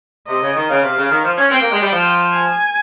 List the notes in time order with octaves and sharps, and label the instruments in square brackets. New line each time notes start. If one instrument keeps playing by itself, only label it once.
[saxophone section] C3 [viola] D#5
[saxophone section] C#3
D#3
[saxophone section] C#3 [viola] F5
[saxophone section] C3
C#3
D#3
F3
C#4
[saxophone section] C4 [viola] G5
[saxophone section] A#3
G#3
G3
F3
[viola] G#5